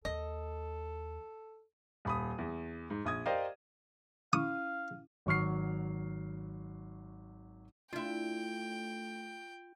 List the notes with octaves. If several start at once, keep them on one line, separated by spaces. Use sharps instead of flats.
D#2 A4 D#5
D#1 B5 D#6
E2
G#2
A#1 D#6 G#6
G4 A#4 C5 D5 D#5 F5
C#4 E4 F5 C#6 D#6
G#1 F#3 C#6 F6 C7
A3 D4 E4 F4 G5